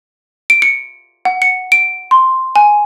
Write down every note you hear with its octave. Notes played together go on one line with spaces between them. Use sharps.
D7
C#7
F#5
C#7
D7
C6
G#5